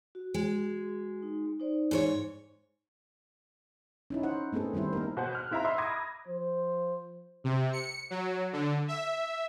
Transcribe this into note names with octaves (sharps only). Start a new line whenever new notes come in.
F#4
G#3
D#4
D#4 C5 D5
G#2 A4 C#5
C#4 D#4 E4
E4 C5 F#5
A3 B3 C4 G#4 A4
D#3 G3 C4 E4 C5
A#3 D#4 A#4
B2 C5 F#5
F6 F#6
C4 E4 E5 F5 A#5 B5
D#5 E5 C6 E6
A#5 B5 D6 D#6 G#6 A#6
F3 C5
C3
C#7
F#3
D3
E5